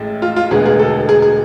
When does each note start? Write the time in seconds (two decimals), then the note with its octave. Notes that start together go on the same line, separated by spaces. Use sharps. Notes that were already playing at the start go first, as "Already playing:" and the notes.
Already playing: A1 A2 G#3
0.22 F4
0.36 F4
0.51 E1 D2 D3 G#3 B3 G#4
0.66 G#4
0.80 A4
1.09 G#4
1.22 G#4